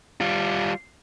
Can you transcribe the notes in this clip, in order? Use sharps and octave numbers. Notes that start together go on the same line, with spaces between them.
G3 F4